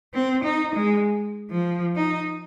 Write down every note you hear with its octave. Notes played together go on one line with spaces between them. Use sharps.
C4
D#4
G#3
F3
D#4